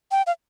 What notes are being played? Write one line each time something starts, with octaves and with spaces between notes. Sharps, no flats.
G5
F5